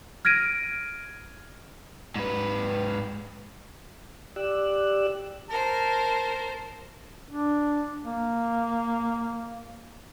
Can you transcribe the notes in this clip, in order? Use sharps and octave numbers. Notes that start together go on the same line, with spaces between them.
F6 G#6 A#6 D7 D#7
G#2 B4
G4 D5 E6 F#6
A#4 C5 A5
D4
A#3